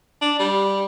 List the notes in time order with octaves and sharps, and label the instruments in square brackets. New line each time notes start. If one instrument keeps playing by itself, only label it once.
[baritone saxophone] D4
G3